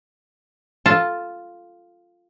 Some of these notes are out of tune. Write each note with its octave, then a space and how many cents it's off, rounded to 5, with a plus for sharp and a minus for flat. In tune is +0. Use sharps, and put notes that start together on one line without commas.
F4 +0 A4 +0 A5 +0